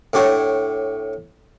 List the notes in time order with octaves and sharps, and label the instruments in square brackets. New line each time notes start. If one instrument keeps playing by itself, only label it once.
[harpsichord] A2 D4 G4 C#5 F#5